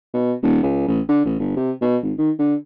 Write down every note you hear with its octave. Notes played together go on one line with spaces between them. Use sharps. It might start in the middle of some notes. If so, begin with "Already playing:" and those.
B2
D#1
C#2
A1
D3
A1
G1
C3
B2
G#1
D#3
D3